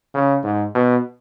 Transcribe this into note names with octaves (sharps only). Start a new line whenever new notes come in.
C#3
G#2
B2